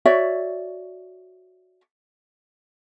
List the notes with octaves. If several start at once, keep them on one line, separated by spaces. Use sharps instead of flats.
F#4 C#5 D5 E5